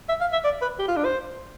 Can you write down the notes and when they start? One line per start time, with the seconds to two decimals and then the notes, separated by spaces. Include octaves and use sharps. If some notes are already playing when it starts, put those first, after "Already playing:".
0.09 E5
0.21 F5
0.33 E5
0.44 D5
0.62 B4
0.79 G4
0.88 F4
0.97 D4
1.05 C5